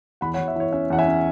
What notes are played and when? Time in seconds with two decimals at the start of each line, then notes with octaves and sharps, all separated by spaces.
0.21 E2 F#5 B5
0.34 C#5 F#5
0.38 E2
0.48 E5
0.56 E3 C#5
0.72 C#4 E5
0.90 E2 F#5
0.98 E5 G#5
1.07 C#4